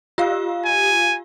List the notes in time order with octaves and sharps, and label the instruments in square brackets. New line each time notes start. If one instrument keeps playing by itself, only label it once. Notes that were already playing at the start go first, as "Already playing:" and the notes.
[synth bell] F4 G4 F5
[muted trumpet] G#5